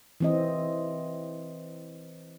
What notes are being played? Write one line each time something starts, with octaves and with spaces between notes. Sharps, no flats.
E3 C4 D#5